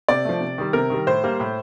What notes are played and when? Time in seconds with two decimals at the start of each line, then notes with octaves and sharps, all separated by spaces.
0.09 C3 D5
0.25 F3 A3
0.41 C3
0.58 D#3 G3
0.73 C3 A#4
0.90 D#3 G3
1.07 A2 C5
1.24 G3 A#3
1.40 A2